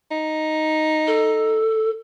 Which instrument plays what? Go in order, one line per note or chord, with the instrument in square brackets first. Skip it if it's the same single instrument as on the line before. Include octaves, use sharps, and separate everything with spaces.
[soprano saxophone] D#4
[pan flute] A4